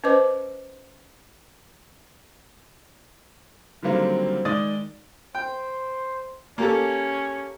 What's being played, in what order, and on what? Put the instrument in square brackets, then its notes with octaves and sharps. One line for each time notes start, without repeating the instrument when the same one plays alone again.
[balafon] C#4 B4 C5 D#5 D6
[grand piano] D3 D#3 F#3 G3 A#3 C4
D#3 G#3 D5 D#6 A6
[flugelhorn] C5 [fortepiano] G5
[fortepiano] A#3 G4 A4 [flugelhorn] C#4